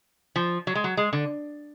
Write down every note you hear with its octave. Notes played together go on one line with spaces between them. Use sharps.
F3
F#3
G#3
F#3
G#3
D3